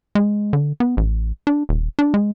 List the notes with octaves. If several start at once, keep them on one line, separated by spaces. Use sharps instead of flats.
G#3
D3
B3
A1
D4
D#1
D4
G#3